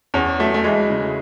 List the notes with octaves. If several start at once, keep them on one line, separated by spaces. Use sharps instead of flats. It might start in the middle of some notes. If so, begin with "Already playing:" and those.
E2 C#4
F#3 A3
A3
E3 G#3
C#3